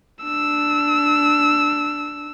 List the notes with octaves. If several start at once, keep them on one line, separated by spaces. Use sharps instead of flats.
D4 E6